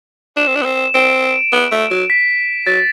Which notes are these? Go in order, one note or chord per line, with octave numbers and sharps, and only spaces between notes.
D4 E7
C4
D4
B3
C4
C4 D7
B3
A3
F#3
B6
F#3 A6